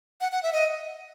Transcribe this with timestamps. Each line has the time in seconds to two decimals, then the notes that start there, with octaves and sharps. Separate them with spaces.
0.21 F#5
0.32 F#5
0.43 E5
0.53 D#5